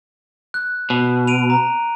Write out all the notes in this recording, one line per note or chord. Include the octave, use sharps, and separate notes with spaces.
F#6
B2
D7 D#7 F7
A#5